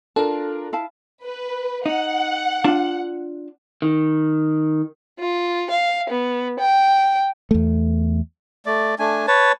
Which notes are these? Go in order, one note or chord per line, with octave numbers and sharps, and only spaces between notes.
D4 F4 A4 A#4 A5
E4 F5 A5
B4
D#4 F#5
D4 F4 A5
D#3
F4
F5
B3
G5
E2 A3
A3 D5
A3 D4 G#5
B4 C#5 A5